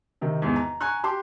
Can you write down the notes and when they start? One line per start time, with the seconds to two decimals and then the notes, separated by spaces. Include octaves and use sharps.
0.21 C3 D#3
0.42 E2 G#2
0.56 A#5
0.81 G#5 A#5 C#6 F#6
1.04 G4 C6 D6